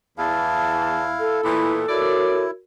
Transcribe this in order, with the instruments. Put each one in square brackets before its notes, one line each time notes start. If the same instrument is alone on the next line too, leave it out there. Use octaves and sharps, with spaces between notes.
[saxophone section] E2 [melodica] E4 F5 [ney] A5
[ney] A4
[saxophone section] A#2 E3 B3 [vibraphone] E4 B5
[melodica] E4 [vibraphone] F#4 A#4 C#5 [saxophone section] D5